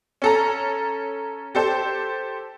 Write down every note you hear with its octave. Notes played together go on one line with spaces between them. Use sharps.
C#4 A4 A#5
G4 A4 C5